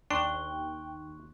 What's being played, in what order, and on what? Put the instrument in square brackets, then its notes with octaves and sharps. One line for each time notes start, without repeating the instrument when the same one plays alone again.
[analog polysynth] D#2 [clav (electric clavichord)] D4 [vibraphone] G5 [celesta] C6 C#6 F#6